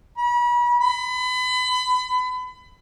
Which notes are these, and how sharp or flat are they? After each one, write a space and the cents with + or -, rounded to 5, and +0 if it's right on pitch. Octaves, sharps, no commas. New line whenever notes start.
B5 -40
B5 +30